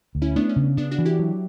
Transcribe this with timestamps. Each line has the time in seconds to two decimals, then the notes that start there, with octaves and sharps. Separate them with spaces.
0.15 D2
0.22 C#4 E4
0.36 A3 B3 D4
0.49 C#4
0.56 C#3
0.77 C#3 B3 D4
0.91 D4 F#4
0.98 E3
1.05 E4 G4
1.19 F#3